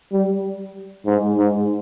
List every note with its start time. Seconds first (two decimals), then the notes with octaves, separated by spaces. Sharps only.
0.12 G3
1.06 G#2
1.38 G#2